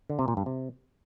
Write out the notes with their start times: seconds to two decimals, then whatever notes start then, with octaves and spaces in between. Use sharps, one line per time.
0.10 D3
0.19 C3
0.28 A#2
0.37 G2
0.46 C3